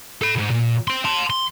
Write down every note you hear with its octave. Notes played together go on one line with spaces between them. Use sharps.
A4 B5
C2 G#2
A#2
C4 C6
A5 C6
C6